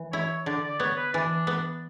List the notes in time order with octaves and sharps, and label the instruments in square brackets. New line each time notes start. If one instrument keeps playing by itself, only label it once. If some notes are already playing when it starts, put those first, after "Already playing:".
Already playing: [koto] E3
[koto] E4 [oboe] C#5
[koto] D3 [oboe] D5
[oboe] D5
[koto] B3 [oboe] C#5
[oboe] B4
[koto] E3 [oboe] D4
[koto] B3